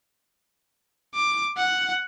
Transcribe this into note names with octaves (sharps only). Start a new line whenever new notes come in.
D6
F#5